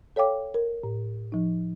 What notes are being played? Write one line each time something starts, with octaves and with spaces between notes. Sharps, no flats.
A4 C#5 F5 G5 D6
A#4
A2
F3 D#4